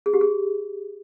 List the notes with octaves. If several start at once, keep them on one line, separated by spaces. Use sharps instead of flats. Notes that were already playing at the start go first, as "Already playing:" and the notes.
G#4
G4
G#4